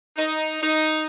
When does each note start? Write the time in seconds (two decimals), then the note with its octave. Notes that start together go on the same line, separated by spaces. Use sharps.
0.17 D#4
0.61 D#4